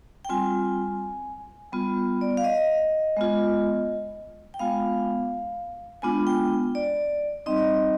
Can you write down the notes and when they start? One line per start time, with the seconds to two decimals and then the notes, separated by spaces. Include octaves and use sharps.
0.25 G5
0.29 G3 C4 F4 G#5
1.73 G3 B3 F4
2.21 D5
2.37 F5
2.44 D#5
3.17 G#3 B3 F4
4.54 G5
4.59 G#3 B3 F4 F5
6.02 G#3 B3 D4 F4 G#5
6.27 G5
6.75 D5
7.46 G3 C4 D#4 D#5